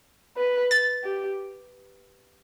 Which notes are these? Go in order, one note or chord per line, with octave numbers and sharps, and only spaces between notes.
B4
A6
G4